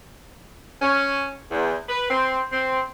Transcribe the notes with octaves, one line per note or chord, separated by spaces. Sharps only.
C#4
E2
B4
C4
C4